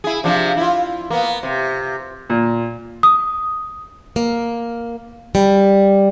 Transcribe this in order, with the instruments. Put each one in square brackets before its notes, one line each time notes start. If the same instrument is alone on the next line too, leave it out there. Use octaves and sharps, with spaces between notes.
[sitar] E4 G#4
C3 F3 D4
E4 F4
A#3 B3
C3
[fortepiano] A#2
[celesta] D#6
[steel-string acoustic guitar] A#3
G3